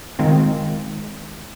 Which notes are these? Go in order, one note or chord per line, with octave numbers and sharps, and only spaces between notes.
D#3 G#3 C4 F4